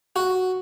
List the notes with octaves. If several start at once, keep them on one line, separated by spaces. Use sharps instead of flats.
F#4